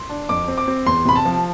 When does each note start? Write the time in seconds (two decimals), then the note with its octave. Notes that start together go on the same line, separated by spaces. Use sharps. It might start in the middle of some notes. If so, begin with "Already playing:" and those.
Already playing: C6
0.09 D4
0.29 F2 D6
0.48 C4
0.58 D6
0.68 C4
0.86 E2 C6
1.05 C3 B5
1.16 A5
1.25 F3